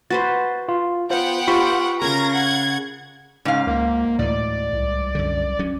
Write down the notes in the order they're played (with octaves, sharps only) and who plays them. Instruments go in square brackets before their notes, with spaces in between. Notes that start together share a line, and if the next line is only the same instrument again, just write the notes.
[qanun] F#4 B4 C5 [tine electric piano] A6
[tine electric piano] F4
[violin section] B3 F#5 G5 [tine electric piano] F4 C5
[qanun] F4 G4 C5 [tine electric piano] B5 C#6 B6
[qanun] C#3 C#4 A#4 [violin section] A#5 G#6 A#6
[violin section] F#5 G#6
[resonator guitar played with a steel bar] G#2 F5 [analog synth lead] C#3
[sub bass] C#2 [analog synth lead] A#3
[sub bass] D2 [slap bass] A2 E3 [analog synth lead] D5
[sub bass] C2
[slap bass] F#2 D3
F#3 C#4